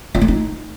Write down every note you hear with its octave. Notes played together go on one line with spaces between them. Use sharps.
F4
A3
D#4